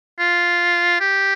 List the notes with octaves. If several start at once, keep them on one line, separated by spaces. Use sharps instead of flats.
F4
G4